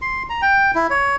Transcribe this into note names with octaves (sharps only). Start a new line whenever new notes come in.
C6
A#5
G5
E4
C#5